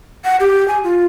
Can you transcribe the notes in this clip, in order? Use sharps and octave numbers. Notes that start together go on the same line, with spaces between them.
F#5
G4
G#5
F4